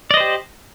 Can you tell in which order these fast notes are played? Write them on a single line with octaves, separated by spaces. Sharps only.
D5 D#5 C5 G4